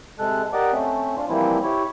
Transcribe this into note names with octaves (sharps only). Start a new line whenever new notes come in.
C3 G#3 A4 F#6
G4 A#4 D5 D#5 F#5 D6
A3 C4 C#4
D4 F4
E3 F3 G3 A#3 C4 E4
E4 G4 C#5